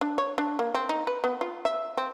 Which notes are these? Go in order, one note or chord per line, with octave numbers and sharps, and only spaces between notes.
D4
C#5
D4
A#3
C4
D#4
B4
B3
F4
E5
C4